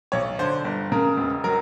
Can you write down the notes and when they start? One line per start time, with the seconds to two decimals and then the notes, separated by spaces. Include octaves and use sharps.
0.12 B1 C#5
0.39 D3 C5
0.65 G1
0.92 C#3 A#4
1.17 E1
1.44 F#3 A#4